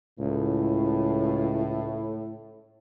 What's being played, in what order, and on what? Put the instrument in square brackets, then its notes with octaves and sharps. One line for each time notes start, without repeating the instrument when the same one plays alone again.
[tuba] C#2 [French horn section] A2